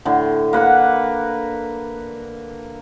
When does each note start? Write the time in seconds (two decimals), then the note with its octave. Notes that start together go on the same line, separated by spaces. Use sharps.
0.05 A2 D3
0.53 A#3 B4 F#5 B5